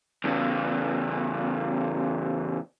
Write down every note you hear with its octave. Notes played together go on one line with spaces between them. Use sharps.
E2 C#3